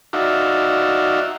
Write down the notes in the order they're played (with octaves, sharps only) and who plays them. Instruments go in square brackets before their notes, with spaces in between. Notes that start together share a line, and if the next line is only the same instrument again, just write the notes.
[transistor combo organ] D#4 F#4 D5 E5 F5